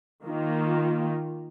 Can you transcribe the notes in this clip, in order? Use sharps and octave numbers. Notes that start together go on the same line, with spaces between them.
D#3 A#3 F4